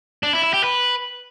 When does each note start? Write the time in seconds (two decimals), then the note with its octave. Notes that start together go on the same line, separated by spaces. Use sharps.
0.23 D4
0.33 E4
0.43 E4
0.54 G4
0.64 B4